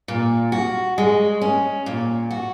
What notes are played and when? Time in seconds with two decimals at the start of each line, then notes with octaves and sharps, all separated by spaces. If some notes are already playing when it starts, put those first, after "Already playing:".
0.08 A#2
0.52 F#4
0.98 G#3
1.41 C#4
1.86 A#2
2.31 F#4